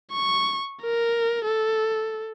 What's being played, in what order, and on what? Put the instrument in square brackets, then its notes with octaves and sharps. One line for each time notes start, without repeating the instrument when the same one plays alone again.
[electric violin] C#6
A#4
A4